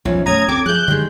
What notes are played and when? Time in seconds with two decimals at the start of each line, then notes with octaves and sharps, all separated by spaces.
0.05 B1 E3 F3 C#4
0.26 B2 A3 C#4 A#5 D#6 G#6
0.48 D2 C4 A4 G5 D6 G#6
0.66 F3 G#4 E5 F#6 G6
0.88 D3 D#3 G3 G#3